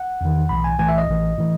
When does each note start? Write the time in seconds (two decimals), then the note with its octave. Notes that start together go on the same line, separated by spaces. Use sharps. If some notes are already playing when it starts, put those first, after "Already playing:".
Already playing: F#5
0.21 E2 D#3
0.49 B1 A2 E3 B5
0.64 G#5
0.79 B1 A2 E3 G#5
0.89 E5
0.98 D#5
1.08 A1 A2 E3
1.38 A2 E3